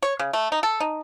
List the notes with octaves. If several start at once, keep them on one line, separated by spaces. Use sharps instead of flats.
C#5
C#3
A3
D#4
A4
D#4